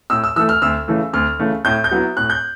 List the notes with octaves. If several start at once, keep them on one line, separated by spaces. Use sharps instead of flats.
A2 E6
E6
E3 A3 E6
F6
D2 E6
C#3 E3 A3
D2 F6
C#3 E3 A3
A2 G6
G6
F#3 B3 E4
A2 F#6
G6